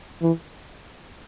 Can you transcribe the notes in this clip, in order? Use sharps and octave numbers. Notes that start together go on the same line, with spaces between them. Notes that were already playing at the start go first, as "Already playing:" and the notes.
E3